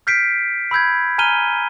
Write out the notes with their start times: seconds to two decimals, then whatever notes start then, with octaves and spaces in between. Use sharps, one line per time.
0.07 F6 G6 B6 C7 D7
0.71 B5 E6 G6 G#6
1.18 G#5 A#5 F6 D#7 G7